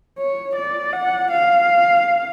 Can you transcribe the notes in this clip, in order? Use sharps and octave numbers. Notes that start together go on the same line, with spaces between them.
C#5
D5
F#5
F5